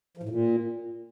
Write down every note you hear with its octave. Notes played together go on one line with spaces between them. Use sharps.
F3
A2
A#2